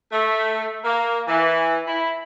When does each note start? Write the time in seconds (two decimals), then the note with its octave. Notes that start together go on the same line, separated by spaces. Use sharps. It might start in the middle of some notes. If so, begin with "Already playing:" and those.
0.11 A3
0.84 A#3
1.27 E3
1.87 E4